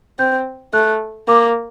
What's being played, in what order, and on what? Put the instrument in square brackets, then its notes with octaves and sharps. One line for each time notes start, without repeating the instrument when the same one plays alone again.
[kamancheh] C4 [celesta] G6
[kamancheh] A3 [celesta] F#6
[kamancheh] A#3 [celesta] D6